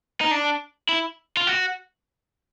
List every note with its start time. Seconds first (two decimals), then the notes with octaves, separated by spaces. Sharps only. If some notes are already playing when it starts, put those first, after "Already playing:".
0.21 D#4
0.31 D4
0.89 E4
1.37 F4
1.47 F#4